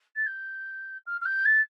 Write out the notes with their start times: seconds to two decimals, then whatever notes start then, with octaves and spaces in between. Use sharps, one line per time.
0.16 A6
0.26 G6
1.06 F6
1.21 F6
1.25 G6
1.45 A6